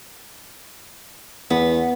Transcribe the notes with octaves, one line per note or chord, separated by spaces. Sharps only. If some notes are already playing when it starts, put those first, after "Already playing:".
E2 B3